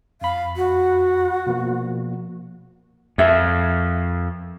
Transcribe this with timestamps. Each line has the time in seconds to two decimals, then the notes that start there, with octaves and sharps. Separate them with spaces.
0.21 F2 F5 B5
0.57 F#4
1.47 B2 F3 A#3
3.18 F2 A#4 E5 F5